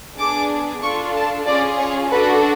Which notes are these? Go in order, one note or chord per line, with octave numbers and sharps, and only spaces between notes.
B3 D4 G#4 D6
D4 F4 A4 C#6
A5
C#4 F4 G#4 D5
C#5
D4 F#4 A4 B4